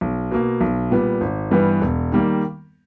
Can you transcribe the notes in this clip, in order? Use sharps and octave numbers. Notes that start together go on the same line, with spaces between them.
B1
B2 A#3
B1
A#2 G3 B3
G#1
G2 E3 G3 B3
E1
D#3 G3 A#3